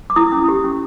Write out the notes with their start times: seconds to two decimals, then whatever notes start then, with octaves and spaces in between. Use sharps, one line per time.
0.10 D6
0.16 E4 D#6
0.32 C#4
0.49 G4
0.64 C#4